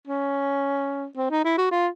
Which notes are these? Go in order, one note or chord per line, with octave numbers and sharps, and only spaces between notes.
C#4
C4
D#4
E4
F#4
F4